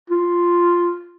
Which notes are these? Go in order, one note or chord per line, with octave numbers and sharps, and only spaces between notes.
F4